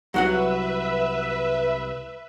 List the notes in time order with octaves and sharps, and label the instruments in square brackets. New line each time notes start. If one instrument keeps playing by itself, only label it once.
[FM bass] C2 [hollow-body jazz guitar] F#3 F#4 F#5 [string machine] B4 E5